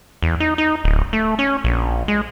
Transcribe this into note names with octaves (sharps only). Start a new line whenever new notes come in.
E2
D#4
D#4
D1
A3
C#4
A#1
G#3